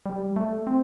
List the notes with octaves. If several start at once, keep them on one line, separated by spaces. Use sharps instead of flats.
G3
A3
C4